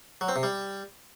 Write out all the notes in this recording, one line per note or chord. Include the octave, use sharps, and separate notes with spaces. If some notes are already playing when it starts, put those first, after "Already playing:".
F#3
C4
C3
G3